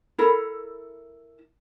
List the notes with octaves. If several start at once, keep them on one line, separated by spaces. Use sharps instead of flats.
E4 A4 A#4 B5